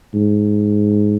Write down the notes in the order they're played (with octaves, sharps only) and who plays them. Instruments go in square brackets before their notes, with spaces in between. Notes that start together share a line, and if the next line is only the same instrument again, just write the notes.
[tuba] G#2